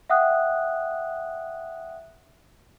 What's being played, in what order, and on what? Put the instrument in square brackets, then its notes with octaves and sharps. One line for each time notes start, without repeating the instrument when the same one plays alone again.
[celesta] E5 F#5 G5 D#6 F#6